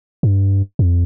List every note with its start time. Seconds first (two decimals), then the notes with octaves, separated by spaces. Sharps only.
0.23 G2
0.79 F2